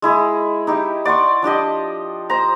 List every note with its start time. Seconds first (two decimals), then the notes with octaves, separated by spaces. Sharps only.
0.02 G#3 E4 G#4
0.67 D#4 E4 G4
1.05 D5 F#5 C6 C#6
1.42 F3 D4 G4 D#5
2.30 C5 A#5